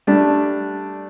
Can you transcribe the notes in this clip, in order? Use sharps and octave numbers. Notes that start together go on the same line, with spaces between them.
G3 A3 D4